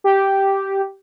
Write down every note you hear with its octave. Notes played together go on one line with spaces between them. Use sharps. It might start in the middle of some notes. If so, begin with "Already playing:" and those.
G4